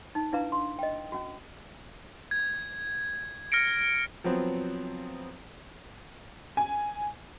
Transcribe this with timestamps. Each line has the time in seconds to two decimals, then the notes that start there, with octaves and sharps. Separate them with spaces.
0.15 D#4
0.33 D4 E4 B4 F5 A#5
0.52 C6
0.79 D#5 G5
1.12 C#4 F#4
2.31 G#6
3.52 F6 A#6 C#7 D7
4.24 F3 F#3 B3 C4
6.57 G#5